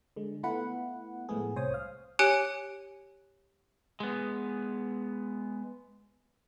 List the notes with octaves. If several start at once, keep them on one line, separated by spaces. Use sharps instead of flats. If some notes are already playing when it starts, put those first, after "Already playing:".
D3 G#3
A3 B3 E4 F4 B4 F#5
A2 F3 G#3 A3 B3 G#4
C2 C5 C#5 D#6
F5
G4 C#5 G#5 F#6 C#7 D7
G#3 B3